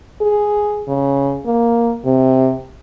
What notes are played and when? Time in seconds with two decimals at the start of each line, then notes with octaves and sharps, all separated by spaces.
0.21 G#4
0.88 C#3
1.45 A#3
2.05 C3